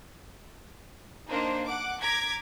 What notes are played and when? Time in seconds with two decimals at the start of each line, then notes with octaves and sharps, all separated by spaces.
1.29 A#3 D4 D#4 A#4 C5
1.66 F#5 D6
2.01 A#5 D6 G#6 B6